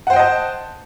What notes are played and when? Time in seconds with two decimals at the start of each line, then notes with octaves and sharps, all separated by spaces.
0.07 F#5
0.10 C5
0.13 G5
0.16 D#5
0.19 A5